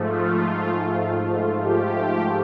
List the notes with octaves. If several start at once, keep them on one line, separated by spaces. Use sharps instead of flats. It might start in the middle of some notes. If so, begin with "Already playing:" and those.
Already playing: G#2 F3 A3
F4
G4